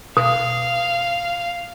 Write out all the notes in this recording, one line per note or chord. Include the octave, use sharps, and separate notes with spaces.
B2 F5 D#6